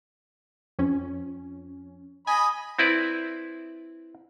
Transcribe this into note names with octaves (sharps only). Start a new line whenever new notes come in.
F2 C#4
D#5 G#5 B5
C4 E4 B4 D5